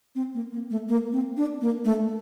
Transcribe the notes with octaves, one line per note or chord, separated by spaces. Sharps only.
C4
A#3
A#3
A3
A#3
C4
D4
A#3
A3